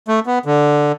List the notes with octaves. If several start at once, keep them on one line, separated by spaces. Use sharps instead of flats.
A3
B3
D3